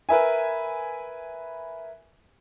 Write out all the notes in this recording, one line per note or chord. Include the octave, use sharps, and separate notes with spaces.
A#4 B4 E5 G#5